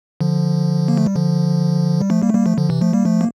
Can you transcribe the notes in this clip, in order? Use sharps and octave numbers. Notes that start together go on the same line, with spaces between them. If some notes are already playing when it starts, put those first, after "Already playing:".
D3 F3
A#3
A3
G3
D3 F3
G3
F3 A3
G3 A#3
A3
G3 A#3
F3 A3
D3 F3
C3 E3
F3 A3
G3 A#3
F3 A3
A#3